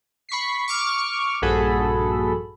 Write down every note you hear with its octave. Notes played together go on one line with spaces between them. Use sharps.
B5 C#6 B6 C7
C#6 D6 F6
A#1 G2 F#4 G#4 A4 B5